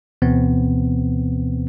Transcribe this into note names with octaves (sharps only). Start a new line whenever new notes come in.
D2 B2 E3 B3 C4